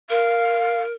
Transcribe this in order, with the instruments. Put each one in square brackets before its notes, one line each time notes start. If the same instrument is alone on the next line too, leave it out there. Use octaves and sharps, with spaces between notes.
[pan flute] A#4 [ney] F5